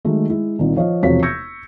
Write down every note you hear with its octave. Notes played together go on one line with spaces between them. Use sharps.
D#3 F#3 G#3 A3
G#3 E4
C2 A#2 D#3
F3 C#5 D#5 F5
E1 C3 F3 F#4 C#5 B6
C#6 E6 G6 G#6 A#6 C#7